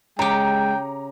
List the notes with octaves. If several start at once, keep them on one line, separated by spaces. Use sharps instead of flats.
C#3 G#3 G4 G5 A#5